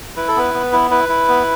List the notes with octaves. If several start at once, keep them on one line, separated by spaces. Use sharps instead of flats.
E4 B4
A4
B3 B4
B3
E4
E4 B4
E4
B3